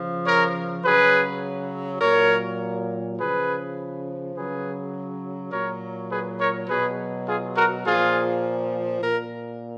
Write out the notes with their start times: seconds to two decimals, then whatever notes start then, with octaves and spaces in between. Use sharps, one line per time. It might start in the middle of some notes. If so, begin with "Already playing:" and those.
Already playing: C#3 F3
0.25 A#4 C#5
0.84 C#3 F#3 G#4 B4
2.00 A#2 F#3 A#4 C#5
3.17 C#3 F3 G#4 B4
4.34 C#3 F#3 G#4 B4
5.51 A#2 F#3 A#4 C#5
6.10 G#4 B4
6.39 A#4 C#5
6.68 B2 F#3 G#4 B4
7.27 F4 G#4
7.55 F#4 A#4
7.85 A#2 F3 F4 G#4
9.01 A#2 A#4